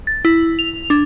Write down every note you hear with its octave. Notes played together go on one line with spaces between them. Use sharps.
A6
E4
F7
D4